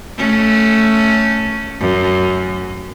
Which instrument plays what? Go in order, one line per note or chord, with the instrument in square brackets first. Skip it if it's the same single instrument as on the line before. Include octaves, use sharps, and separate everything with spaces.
[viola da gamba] A3 C#4
F#2